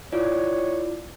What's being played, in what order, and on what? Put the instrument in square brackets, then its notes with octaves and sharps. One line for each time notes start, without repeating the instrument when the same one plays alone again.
[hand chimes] E4 F4 D5 [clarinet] C#5